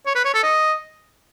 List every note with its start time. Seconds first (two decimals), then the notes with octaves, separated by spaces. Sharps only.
0.06 C#5
0.15 B4
0.25 C#5
0.34 A4
0.43 D#5